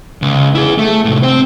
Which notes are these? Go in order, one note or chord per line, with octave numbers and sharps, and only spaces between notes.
C#2
E4 G#4
A3
A2 C3
C4 C5